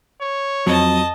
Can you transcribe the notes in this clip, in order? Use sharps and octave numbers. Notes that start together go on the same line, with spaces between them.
C#5
F2 F#3 D#5 A5